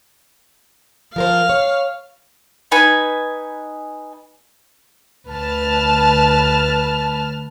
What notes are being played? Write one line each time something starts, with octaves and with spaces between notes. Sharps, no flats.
F3 A#4 C5 F5
C#5
D#4 B4 G#5 B5
D2 B4 A5 F6